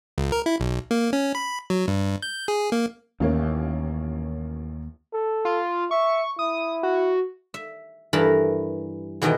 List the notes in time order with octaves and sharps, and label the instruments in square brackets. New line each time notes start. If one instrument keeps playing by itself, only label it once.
[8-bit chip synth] C#2
A#4
E4
B1
A#3
C#4
B5
F#3
G2
G6
G#4
A#3
[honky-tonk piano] A1 A#3 C#4 [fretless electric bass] D#2
[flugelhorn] A4
[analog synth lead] F4
[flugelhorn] E5 [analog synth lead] C#6
[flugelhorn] E4 [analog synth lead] D#6
[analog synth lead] F#4
[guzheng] E5
G2 E3 A4 A#4 A5 B5
E2 B2 D#3 E3 D#5 G5